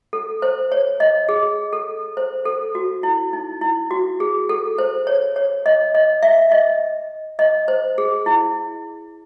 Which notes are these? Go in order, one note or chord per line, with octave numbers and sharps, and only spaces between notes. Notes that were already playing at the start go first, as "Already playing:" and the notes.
A4
C5
C#5
D#5
G#4
A4
C5
A4
F#4
E4
D#4
E4
F#4
G#4
A4
C5
C#5
C#5
D#5
D#5
E5
D#5
D#5
C5
G#4
E4